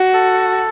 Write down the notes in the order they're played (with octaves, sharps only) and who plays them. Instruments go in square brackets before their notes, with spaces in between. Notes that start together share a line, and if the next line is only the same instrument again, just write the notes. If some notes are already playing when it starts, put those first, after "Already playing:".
Already playing: [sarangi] F#4
[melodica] A4